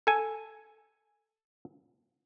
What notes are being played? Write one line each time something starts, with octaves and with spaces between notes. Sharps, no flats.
A4 G#5